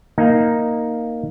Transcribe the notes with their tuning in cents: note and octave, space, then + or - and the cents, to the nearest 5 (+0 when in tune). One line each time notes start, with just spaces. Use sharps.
A#3 +0 D#4 +0